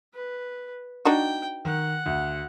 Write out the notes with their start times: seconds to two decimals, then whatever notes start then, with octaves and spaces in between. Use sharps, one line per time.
0.14 B4
1.05 D4 D#4 F#4 G5
1.65 D#3 F#5
2.06 D2